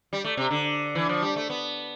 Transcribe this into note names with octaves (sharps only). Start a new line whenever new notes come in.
G3
A3
C3
D3
E3
F3
G3
A3
B3